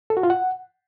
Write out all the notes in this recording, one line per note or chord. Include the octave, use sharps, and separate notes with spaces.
A4
F#4
F4
F#5